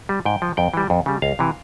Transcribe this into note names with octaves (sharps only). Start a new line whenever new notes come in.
G3
G#2 G5
F3
F2 G5
E3 G3
F2
C#3 G3
C#2 F5
C3 E3